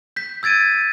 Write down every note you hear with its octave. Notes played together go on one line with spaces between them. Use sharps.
G6 B6
E6 G#6 A6 D7 D#7